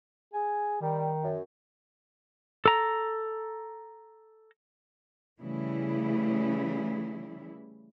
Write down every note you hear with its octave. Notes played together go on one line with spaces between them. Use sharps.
G#4 G#5
D#3 G3
F#2
A4 A#5
C#3 E3 G3 A3 E4